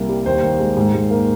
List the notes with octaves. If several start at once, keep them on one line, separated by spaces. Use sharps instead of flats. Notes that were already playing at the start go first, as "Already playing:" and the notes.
Already playing: C2 A#3
G3
D#2 C5
D#2
G#3
G#2
G#2
A#3